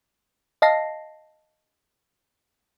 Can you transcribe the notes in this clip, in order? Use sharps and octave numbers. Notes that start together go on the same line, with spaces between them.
D#5 F5 A5 A#6 C7